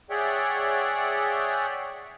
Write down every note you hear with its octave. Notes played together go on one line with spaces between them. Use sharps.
G#4 C#5 D5 E5 F#5 G5